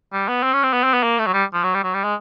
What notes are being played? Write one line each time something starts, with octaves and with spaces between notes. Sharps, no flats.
G3
B3
C4
C#4
C4
B3
C4
B3
A#3
A3
F#3
G3
F3
F#3
G3
F#3
G3
G#3